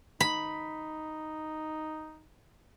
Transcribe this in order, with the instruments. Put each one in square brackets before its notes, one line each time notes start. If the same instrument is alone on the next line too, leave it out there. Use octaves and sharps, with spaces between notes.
[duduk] D#4 [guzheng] B5